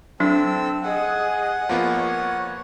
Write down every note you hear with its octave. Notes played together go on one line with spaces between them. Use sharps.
F#3 C4 D4 A4 E6
G#4 D#5 F#5
F3 A#3 B3 C#5